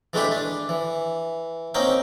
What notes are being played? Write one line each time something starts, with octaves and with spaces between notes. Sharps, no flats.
E3 G#3 A3 D4 G4 B4
D4
E3
A#3 C4 C#4 D#4 G5